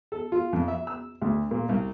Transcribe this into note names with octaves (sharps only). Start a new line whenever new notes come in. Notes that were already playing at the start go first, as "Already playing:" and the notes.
A4
F4
F2
E5
E6
D2
A#2
C2